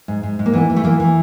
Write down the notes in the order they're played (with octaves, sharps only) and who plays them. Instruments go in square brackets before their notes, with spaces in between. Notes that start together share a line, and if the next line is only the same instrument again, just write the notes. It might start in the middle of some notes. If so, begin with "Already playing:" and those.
[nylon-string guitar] G#2
G#2
G#2
A#3
E3 B3
E3
A3
E3 A#3
E3